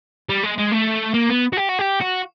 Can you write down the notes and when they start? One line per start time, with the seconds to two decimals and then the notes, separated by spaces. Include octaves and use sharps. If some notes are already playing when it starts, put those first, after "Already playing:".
0.29 G3
0.43 G#3
0.58 G#3
0.71 A3
1.14 A#3
1.29 B3
1.53 F#4
1.57 G4
1.69 F#4
1.79 G4
2.00 F#4